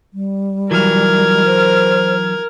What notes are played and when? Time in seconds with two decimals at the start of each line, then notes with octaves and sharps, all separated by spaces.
0.14 G3
0.71 E3 F#3 A#4 F6 G#6
1.46 C5